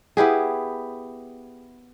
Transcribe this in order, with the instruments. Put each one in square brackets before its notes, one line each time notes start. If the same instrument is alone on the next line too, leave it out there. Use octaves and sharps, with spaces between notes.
[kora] B3 E4 G4 G#4